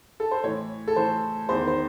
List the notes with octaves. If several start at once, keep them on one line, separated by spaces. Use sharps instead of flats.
A4
C5
A2 E3 C#5
A4
A2 E3 C5
E2 D#3 C5
C5